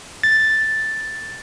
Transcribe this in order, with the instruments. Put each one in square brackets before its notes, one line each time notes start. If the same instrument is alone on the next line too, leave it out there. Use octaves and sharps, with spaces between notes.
[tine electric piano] A6